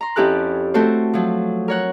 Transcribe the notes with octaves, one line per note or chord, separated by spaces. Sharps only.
A#5 C6
F2 C#4 E4 G4 A4 F#6
A3 C4 F#4 A4 C5
F3 F#3
A#4 C#5 F#5